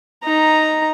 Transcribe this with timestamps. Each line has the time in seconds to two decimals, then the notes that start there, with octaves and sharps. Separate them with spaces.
0.24 D#4 A#5